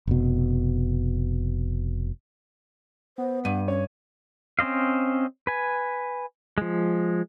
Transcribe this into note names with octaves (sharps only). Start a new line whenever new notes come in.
F1 B2
B3 C5
G2 F#5 D#7
C#4 C#5
C4 C#4 C5 D#5 F5
B4 G#5
F3 G#3